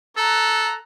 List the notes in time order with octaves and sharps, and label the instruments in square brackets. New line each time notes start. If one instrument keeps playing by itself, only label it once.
[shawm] A4 [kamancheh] A#5 F#6